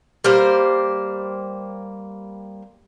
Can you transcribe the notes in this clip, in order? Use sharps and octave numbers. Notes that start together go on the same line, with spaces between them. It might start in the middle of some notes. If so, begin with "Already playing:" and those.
G3 A#3 C5